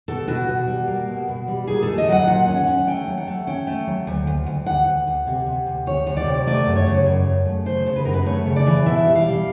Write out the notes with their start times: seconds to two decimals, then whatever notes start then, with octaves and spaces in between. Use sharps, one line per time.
0.08 B2 A4
0.28 B2 F#4
0.48 B2
0.67 G3
0.88 A#3
1.08 B2
1.28 B2
1.48 G3
1.67 A#2 G#4
1.83 A4
1.88 A3
1.98 D#5
2.08 F#3 F#5
2.27 A#2 F#5
2.48 C#4
2.57 F#5
2.67 C#4
2.87 A3 G5
3.07 F#3
3.18 F#5
3.27 A3
3.47 C#4 G5
3.67 A3
3.87 F#3
4.07 D2
4.27 D2
4.47 D2
4.66 D2 F#5
4.87 D2
5.07 D2
5.27 C3
5.46 C3
5.67 D2
5.86 D2 C#5
6.07 D2
6.17 D5
6.27 C3
6.47 A3 D5
6.66 F#2
6.76 C#5
6.86 C#3
7.06 F#2
7.27 F#2
7.46 A3
7.66 C#3 C5
7.86 C#3
7.96 B4
8.05 F#2 A#4
8.14 B4
8.26 A3 C#5
8.46 C#3
8.56 D5
8.67 E3
8.85 B2 E5
9.06 G3
9.15 F5
9.26 G3